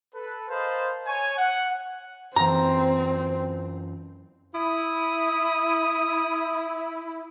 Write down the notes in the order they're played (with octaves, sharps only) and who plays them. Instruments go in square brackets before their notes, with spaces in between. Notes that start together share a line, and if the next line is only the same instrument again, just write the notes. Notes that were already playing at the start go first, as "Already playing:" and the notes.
[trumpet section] A4 B4
A#4 C5 D#5 F5 A5 B5
C#5 G#5
F#5
[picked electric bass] F#2 E3 [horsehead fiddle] C4 [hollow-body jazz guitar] A#5
[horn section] E4 [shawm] D#6